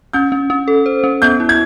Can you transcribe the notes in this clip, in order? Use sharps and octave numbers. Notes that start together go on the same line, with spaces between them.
C#4 G6
C#4
C#4
A4
C5
C#4
B3 G6
E4
G#6